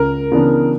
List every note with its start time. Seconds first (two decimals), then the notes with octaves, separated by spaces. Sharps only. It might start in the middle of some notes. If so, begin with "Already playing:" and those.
Already playing: C#2 A#4
0.32 C#3 E3 B3 D4